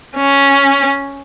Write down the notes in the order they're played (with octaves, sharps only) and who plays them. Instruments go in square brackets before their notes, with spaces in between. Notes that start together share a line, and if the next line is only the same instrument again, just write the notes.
[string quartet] C#4